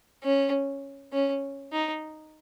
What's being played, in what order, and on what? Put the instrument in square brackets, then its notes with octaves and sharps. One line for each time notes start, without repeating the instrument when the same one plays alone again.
[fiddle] C#4
C#4
D#4